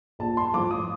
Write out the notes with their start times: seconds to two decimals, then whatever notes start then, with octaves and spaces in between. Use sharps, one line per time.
0.19 A#1 A5
0.37 C6
0.54 A2 F3 D6
0.71 D#6